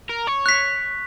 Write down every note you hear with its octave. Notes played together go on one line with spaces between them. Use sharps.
A#4
C#5
F#6 B6